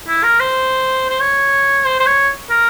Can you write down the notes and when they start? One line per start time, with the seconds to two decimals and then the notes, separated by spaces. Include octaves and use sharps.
0.08 E4
0.24 A#4
0.40 C5
1.10 C5
1.20 C#5
1.85 C5
2.00 C5
2.06 C#5
2.50 A#4